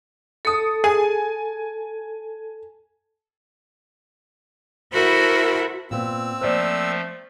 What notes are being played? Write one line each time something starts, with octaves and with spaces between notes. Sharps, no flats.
A4 A5 D#6 C#7
G#4 G#5
E4 F#4 A4 A#4 C5 B5
A#2 B3 C4 E6
F3 A3 A#3 C5 D5